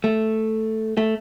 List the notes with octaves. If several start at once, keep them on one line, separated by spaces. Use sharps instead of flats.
A3
A3